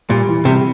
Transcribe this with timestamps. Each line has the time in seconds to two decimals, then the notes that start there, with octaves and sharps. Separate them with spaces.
0.09 A#2 G3
0.28 E3
0.45 C3 G3